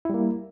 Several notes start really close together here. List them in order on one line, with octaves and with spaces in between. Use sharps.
E4 G3 A#3